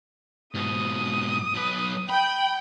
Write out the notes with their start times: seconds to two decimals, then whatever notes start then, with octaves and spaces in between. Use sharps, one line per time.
0.55 G#2 B2 D#6
1.54 B1 B4
2.10 G5 B5